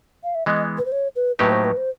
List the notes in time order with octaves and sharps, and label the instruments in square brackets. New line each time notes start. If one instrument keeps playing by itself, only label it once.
[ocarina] F5
E5
[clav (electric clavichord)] E3 G#3 B3 [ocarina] D#5
[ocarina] B4
C5
C#5
B4
[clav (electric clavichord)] A2 F#3 A#3 D#4 G4 [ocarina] B4
[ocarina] C5
B4
C5